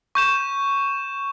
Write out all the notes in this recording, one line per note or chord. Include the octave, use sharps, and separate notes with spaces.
C#6 G6 E7